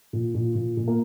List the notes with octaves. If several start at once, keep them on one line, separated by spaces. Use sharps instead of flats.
A#2
A#2
A#2
A#2
A#3